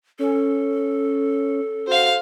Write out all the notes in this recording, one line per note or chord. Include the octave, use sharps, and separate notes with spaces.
C#4 A4
F#4 C5 F5